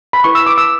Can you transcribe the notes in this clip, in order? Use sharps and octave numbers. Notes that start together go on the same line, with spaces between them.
B5
E4 B4 C#6
E6
D6
E6